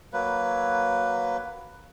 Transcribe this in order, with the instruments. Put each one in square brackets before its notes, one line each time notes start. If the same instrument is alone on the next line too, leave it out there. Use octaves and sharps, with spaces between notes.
[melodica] F#3 A#3 B4